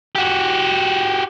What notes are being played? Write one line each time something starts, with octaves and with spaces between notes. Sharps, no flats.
F#4 G4